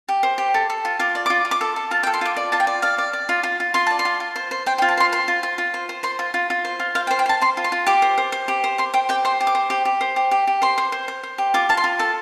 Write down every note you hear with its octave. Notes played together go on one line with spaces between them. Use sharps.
G4
C5
G4
A4
A4
F4
F4 D6
D5
F4 D6
F4
D6
A4
A4
F4 A5
G5
A4
C6
F4 D6
D5
F4 A5
G5
D5
D5 F5
D5
D5
F4
F4
F4
F4 C6
D5 A5
C6
F4
F4
C5
C5
C5 G5
G5
F4
A5
C5 C6
C5 C6
F4
F4
F4
C5
C5
C5 C6
F4
F4
F4
C5
F4
C5 F5
G5
C5
G5
C5 A5
C5 C6
F4
C6
F4
G4 D6
C5
C5
C5
G4
C5
C5 C6
C5 G5
G4 G5
C5 C6
G4
D6
C5
G4
G4
C5
G4
G4
G4
C5 C6
C5
C5
C5
C5
G4
F4 D6
F4 A5
C6
F4
A4 A5